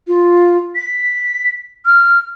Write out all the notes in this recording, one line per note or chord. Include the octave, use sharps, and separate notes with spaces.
F4
B6
F6